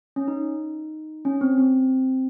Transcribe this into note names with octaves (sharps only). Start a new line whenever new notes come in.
C#4
D#4
C#4
C4
C4